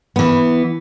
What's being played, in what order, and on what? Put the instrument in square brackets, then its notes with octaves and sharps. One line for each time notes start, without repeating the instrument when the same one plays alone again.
[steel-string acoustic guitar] E3 B3